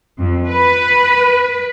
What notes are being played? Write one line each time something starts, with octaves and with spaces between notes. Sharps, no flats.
F2
B4